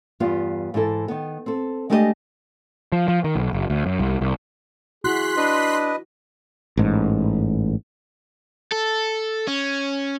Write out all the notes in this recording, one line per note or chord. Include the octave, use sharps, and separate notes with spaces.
E2 G2 G3 B3 F4 F5
G#2 E3 E4 A4
D#3 B3
C4 A4
G#3 A3 D4 G4 B4 D#5
F3
F3
D#3
B1
F#1
D2
F#2
C2
C2
E4 F#4 G#4 C6 F#6 B6
D4 B4 D#5
A1 G#2
A4
C#4